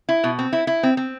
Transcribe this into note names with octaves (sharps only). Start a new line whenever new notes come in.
E4
B2
C4
E4
E4
C4
C4